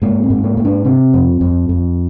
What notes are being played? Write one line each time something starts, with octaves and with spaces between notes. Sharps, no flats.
G#2 A#3
C4
G#2
A#3
G#2
D4
C3 C4
F2
F2
F2